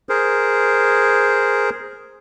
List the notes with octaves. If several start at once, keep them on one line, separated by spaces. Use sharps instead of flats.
G#4 A#4 C5